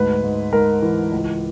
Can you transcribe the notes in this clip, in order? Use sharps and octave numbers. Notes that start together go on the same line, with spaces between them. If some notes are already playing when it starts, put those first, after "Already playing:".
Already playing: D2 G#2 B4
G#2
G#2 A#4
E3
C#2